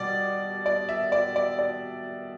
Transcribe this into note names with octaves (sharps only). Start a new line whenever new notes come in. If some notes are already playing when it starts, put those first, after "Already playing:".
Already playing: B2 G3 D5
D5
E5
D5
D5
D5